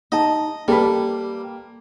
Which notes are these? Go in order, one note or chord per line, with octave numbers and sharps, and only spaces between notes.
D#4 D#5 A5
G3 A#3 A4 B4